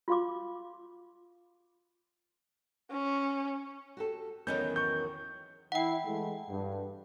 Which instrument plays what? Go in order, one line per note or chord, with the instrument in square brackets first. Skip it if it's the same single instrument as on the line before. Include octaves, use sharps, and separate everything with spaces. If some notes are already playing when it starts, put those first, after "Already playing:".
[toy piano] F4 F#4 F5 C6 D6
[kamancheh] C#4
[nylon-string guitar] F#4 G4 A4
[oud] E2 D#3 F#3 [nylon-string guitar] B3 C#4 [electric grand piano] G6
[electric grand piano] C#6 G6
[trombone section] E3 E4 [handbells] F#5 G5
[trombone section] E3 G#3 A3
G2